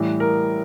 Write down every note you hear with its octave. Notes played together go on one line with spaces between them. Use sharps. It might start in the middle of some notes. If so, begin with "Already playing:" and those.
Already playing: A2 E3 G3
A#4